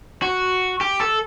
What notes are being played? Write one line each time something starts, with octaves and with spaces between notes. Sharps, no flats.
F#4
G4
A4